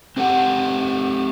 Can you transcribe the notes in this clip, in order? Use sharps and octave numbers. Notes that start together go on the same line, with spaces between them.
C4 G4 A4 F#5